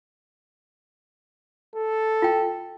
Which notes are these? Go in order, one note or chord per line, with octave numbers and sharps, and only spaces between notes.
A4
F4 G5